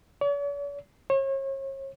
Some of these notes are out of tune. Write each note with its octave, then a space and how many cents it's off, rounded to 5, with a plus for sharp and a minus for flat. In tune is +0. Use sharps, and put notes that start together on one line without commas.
C#5 +45
C#5 -40